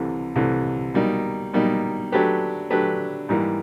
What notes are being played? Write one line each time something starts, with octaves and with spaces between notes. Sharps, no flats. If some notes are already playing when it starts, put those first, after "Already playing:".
Already playing: C2 C3 E3 A3
C2 C3 E3 A3
B2 G3 A#3 D#4
B2 G3 A#3 D#4
F#3 A3 D4 G4 B4
F#3 A3 D4 G4 B4
G#2 E3 G3 A#3